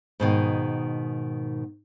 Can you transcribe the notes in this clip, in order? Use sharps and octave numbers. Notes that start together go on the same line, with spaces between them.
G#2 B2 D#3